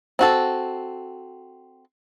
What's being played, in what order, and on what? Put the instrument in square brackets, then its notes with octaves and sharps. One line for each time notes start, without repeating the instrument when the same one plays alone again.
[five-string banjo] C4 F#4 A4